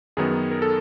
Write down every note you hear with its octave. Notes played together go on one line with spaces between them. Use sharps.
F#2 D#3 F#3 B3 G#4
A#4
A4